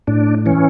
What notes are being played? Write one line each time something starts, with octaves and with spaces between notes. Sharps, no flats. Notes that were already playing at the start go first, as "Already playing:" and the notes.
A2 D4
E3 C#4